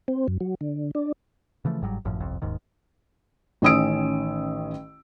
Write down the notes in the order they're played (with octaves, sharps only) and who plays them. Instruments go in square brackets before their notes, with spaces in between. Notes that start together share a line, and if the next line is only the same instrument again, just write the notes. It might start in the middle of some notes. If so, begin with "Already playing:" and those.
[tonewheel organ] C4
F#2
F#3
D3
D4
[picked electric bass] C#3 E3 F3 A3
G1 G#2 F#3 G3
G#1 F#2 A2 F3
G1 C2 F2
D#1 D#2 G#2 D#3
[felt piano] A1 D#3 C#4 D#6 E6 D7